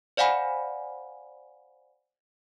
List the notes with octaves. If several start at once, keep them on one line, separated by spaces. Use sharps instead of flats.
C5 D5 F5 F#5 G#5 B5